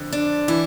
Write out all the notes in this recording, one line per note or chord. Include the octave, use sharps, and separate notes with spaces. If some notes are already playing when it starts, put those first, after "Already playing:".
Already playing: F2 D3
D4
E3 E4